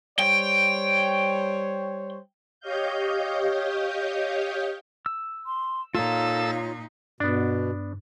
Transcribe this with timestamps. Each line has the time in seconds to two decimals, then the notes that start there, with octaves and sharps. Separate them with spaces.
0.19 G3 C5 C#5 G5
2.60 G4 C#5 D#5 F5 G6
5.06 E6
5.46 C6
5.95 A#2 D#4 F4 A4 C#5 F5 E6
7.20 G2 B2 B3 D4